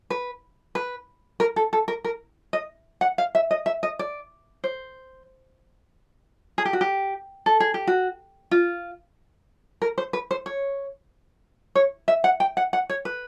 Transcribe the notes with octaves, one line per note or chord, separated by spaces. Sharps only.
B4
B4
A#4
A4
A4
A#4
A#4
D#5
F#5
F5
E5
D#5
E5
D#5
D5
C5
G#4
G4
F#4
G4
A4
G#4
G4
F#4
F4
A#4
C5
B4
C5
C#5
C#5
E5
F#5
G5
F#5
F#5
C#5
B4